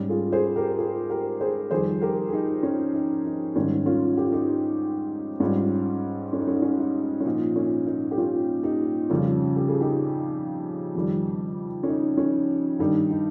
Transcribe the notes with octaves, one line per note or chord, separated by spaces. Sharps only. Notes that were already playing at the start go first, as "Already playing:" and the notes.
Already playing: G#2 G3 C#4
F4 G#4
G#4 C5
G4 A#4
F4 G#4
G4 A#4
G#4 C5
F2 D#3 G3 G#4 C5
G4 A#4
G#4
D#4 G4
C#4
D#4
D#4
G#2 D#3 G3 C#4
C#4 F4
G4
F4
D#4 G4
G#2 G3 C#4 F4
C#4
D#4
C#4
D#4
C#4
D#4
C#4
A#2 F3 D#4
C#4
D#4
G4
C#4 F4
D#4 G4
F2 C#3 G3 C#4 F4
G4
G#4
D#4 G4
F2 D#3 G3
C#4
D#4
C#4
G2 D#3 G3 D#4
D#4